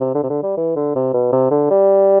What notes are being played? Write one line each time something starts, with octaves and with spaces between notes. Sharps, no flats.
C3
D3
C3
D3
G3
E3
D3
C3
B2
C3
D3
G3